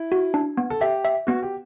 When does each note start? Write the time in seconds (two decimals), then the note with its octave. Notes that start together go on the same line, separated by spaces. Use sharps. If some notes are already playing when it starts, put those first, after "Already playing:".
Already playing: E4
0.12 F#4
0.34 D4
0.57 B3
0.70 A4
0.81 G4 E5
1.05 E5
1.27 B3 F#4
1.43 G4